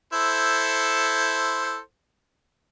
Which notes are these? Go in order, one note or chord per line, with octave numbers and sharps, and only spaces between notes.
E4 A4 C5